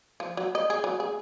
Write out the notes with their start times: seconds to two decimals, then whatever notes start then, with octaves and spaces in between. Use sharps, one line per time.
0.20 F3
0.37 F#3
0.55 D#5
0.70 G#4
0.84 F#3
1.00 G#4